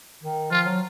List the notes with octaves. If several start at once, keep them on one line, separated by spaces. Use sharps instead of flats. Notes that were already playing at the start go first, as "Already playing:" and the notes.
D#3
F3 F4
F#3